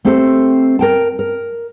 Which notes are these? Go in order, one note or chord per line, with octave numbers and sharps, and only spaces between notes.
A3 C4 G4 A4 C5
A#4 G5 A5
A#4